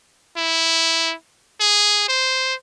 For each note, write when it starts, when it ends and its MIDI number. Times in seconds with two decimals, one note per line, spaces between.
0.37 1.14 64
1.60 2.05 68
2.09 2.55 72